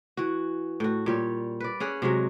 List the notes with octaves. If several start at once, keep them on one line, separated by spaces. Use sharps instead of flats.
E3 F#4
A2 F#4
A#2 G3 C#5
B4 D5
C#4 G#4 F#5
C3 F#3 G#3 F#4